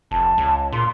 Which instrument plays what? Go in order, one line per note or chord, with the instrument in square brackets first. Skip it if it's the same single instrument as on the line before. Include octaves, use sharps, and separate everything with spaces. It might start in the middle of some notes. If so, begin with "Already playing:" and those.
[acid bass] F1 [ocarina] A5
[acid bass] C#2
[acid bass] A#2 [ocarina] C6